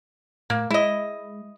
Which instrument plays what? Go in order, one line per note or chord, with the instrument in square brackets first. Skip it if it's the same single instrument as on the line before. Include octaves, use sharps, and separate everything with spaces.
[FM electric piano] A2 [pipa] A#3
[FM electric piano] G#3 [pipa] E4 D#5